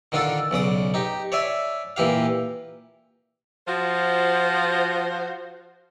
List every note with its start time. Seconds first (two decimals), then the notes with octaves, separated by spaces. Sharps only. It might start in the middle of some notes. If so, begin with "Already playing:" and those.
0.12 D3 D#3 D4 F4 A4
0.51 B1 C#3 D5 D#6
0.94 D#4 G4
1.32 C#5 D5 E5 G#5
1.96 A#2 E3 G4 F5
3.68 F3 F4 F#4 C5